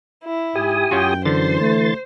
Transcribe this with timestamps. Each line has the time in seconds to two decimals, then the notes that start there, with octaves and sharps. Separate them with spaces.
0.24 E4
0.56 G#2 G4 G#5 D#6
0.91 F#2 C#4 F4 F#4 G5
1.25 D3 E3 C5 C6 A6
1.60 A3